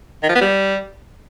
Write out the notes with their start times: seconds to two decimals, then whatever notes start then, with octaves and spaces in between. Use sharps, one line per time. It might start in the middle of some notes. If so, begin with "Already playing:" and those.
0.23 D#3
0.29 F3
0.35 B3
0.41 G3